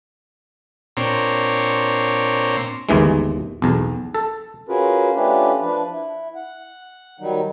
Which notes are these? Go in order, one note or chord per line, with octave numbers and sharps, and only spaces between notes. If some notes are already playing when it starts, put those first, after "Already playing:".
A#2 C4 D4 C#5 A#5 C6
G1 D#2 E3 G#3
B1 E2
A4
C#4 F4 F#4 G#4 A#4 B4
A3 C#4 D4 F4 G4 B4
F3 D4 B4
E4
F#5
D#3 F#3 G3 D#4